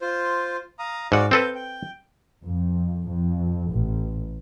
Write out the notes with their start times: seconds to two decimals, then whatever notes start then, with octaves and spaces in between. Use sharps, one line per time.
0.01 F4 C5
0.79 F5 A#5 D#6
1.12 G#2 F#4 D5 F5 F#5
1.31 C4 A4 B4 F5 G6
1.55 G5
2.45 F2
3.08 F2
3.71 A1